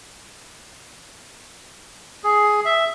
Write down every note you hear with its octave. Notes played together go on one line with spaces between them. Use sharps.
G#4
E5